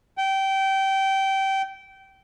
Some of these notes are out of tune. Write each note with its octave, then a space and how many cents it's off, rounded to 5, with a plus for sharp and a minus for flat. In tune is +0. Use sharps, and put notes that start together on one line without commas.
G5 -20